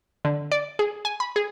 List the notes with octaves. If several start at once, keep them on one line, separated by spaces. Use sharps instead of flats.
D3
D5
G#4
G#5
B5
G#4